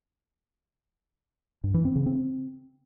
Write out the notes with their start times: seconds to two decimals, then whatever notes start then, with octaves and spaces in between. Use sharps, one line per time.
1.64 G2
1.74 E3
1.85 C4
1.96 C#3
2.06 C4